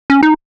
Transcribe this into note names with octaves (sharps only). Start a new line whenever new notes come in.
C#4
D#4